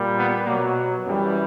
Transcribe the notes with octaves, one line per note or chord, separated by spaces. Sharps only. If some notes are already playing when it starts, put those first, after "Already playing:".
Already playing: A#2 G3
B3
B2 F#3 A#3
F#2 E3 G3